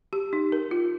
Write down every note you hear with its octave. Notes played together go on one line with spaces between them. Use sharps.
G4
D#4
A#4
F4